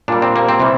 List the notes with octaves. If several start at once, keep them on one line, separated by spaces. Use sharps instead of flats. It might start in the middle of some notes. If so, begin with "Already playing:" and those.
A#2 G3 D4
C4
A#3
C4
C3 E3 G3